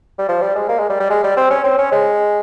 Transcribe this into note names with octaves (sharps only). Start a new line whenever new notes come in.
G3
F3
G3
G#3
A#3
G#3
G3
G3
G#3
G3
C4
C#4
C4
C#4
G#3